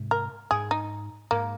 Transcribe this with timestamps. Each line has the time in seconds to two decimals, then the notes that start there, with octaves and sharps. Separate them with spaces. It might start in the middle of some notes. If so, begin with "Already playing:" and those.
Already playing: G#2 C3
0.11 A#4
0.51 G#2 G#4
0.71 D#4
1.31 G#2 A#3